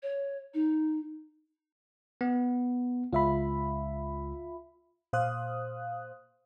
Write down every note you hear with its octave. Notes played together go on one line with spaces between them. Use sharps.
C#5
D#4
B3
C#2 F4 E5 B5
A#2 C5 F5 D#6 F#6